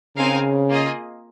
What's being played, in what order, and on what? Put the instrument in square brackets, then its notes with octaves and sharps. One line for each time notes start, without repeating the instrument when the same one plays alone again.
[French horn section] C#3 [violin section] C4 D#4 A#4 F5 G#5
[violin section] A#3 F4 G#4 D#5